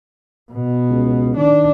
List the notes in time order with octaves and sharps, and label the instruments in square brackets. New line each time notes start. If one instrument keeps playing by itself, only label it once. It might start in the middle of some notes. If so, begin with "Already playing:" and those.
[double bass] B2
[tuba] C#2
[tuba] D#3 [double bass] D4